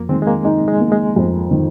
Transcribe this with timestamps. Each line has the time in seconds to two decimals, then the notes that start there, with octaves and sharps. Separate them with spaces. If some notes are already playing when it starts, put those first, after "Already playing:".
Already playing: F2 A#3
0.09 D#3 G#3 C4
0.22 G#3
0.27 A#3
0.45 G#3 D#4
0.68 G#3
0.80 A#3
0.92 G#3
1.16 F2
1.51 D#3